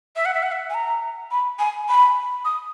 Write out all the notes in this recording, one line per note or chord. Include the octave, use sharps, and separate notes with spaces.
E5
F#5
E5
F#5
E5
G#5
A#5
B5
G#5
B5
D#6